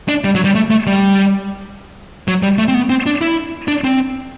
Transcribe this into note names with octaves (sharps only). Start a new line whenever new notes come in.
D4
G3
F#3
G3
A3
A3
G3
F#3
G3
A3
C4
B3
C4
D4
E4
D4
C4